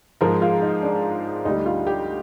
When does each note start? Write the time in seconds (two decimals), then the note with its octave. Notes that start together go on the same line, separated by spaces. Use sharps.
0.21 G#2 F3 G#3 A#4
0.42 F4
0.62 D#4
0.83 D4
1.45 D2 D3 G3 D#4
1.66 F4
1.87 G4